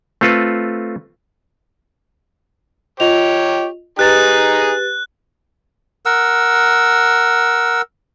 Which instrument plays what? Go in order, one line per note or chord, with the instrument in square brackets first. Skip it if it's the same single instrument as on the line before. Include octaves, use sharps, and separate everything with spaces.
[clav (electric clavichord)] A3 C4 F4 A4 B4
[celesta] F4 D#5 F7 [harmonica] G4 C#5
[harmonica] D#4 G#4 A#5 [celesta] G4 B4 A6 [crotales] F#6
[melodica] A#4 F#5 E6